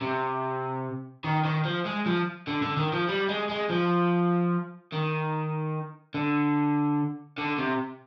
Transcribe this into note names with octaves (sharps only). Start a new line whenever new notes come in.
C3
D#3
D#3
F3
G#3
F3
D3
D3
D#3
F3
G3
G#3
G#3
F3
D#3
D3
D3
C3